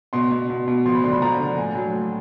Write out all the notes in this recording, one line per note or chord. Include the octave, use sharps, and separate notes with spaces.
B2 C6
B2
B2
B2
F3 C6
B5
D3 C6
B5
F3 A#5
D3
A2 G#5
F#3
A2